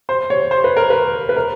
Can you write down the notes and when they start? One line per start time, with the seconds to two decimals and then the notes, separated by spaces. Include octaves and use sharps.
0.09 C5
0.30 C#5
0.51 C5
0.64 B4
0.77 A#4
0.90 B4
1.29 B4
1.36 A#4